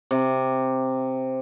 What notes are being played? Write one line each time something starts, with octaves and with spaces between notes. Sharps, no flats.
C3